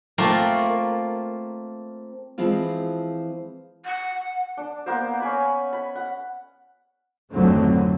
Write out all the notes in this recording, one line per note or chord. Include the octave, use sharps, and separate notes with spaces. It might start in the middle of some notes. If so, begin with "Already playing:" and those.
A3 A#3 C4 F4 A#4
E3 F3 G#3 C4 F4
F#5
D4
A#3 B3 A#4 C5
C#4 G#5 B5
B5
F#5
G#1 F2 D3 F#3 A3 C4